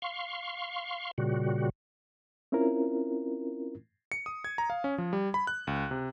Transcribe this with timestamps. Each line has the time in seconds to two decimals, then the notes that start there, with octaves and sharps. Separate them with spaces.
0.02 F5 C6 C#6
1.18 A#2 C#3 G3 F#4
2.52 C4 C#4 E4 F4 A#4
4.12 C#7
4.26 D#6
4.44 G#6
4.58 A#5
4.70 F5
4.84 C#4
4.98 F3
5.13 G3
5.34 B5
5.47 F#6
5.67 C#2
5.91 C3